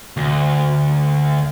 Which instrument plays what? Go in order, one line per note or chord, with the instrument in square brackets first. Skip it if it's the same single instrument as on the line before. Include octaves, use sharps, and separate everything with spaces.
[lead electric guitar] D2